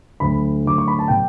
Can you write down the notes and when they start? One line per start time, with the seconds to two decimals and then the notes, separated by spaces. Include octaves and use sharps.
0.20 D2 D3 F#3 B5
0.65 D2 D3 F#3 D6
0.78 C#6
0.88 B5
0.99 A5
1.08 B2 F#3 G5